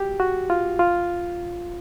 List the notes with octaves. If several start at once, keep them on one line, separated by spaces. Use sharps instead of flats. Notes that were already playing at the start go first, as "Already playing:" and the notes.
Already playing: F#4 G4
F#4
F4
F4